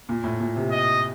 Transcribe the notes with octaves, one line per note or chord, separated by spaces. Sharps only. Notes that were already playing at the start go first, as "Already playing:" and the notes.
A#2
A2
A#2
C3
D#5